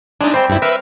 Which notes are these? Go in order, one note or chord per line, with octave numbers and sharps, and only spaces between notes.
G#3 D4 D#4 E5
G3 C4 C5
G2 E4
A#4 B4 E5 F5